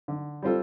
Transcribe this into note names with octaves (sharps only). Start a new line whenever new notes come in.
D3
G3 C4 F4 A4